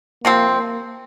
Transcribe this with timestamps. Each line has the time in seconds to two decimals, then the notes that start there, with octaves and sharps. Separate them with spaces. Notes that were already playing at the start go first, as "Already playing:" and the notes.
0.24 C3 F3 A#3 C4
0.56 A#3